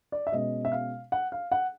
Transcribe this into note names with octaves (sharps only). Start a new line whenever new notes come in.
D5
E5
B2 G#3 C#4 D#5
E5
F5
F#5
F5
F#5